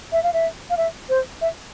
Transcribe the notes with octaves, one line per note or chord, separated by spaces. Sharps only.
E5
F5
E5
F5
E5
C5
E5